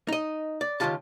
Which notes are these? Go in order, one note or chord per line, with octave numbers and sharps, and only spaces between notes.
D#4 D#5
D5
C#2 A#2 D#3 F4 G4 A5